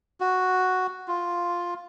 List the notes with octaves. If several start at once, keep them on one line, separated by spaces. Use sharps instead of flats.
F#4
F4